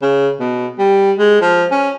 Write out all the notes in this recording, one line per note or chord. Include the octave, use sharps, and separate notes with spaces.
C#3
B2
G3
G#3
F3
C#4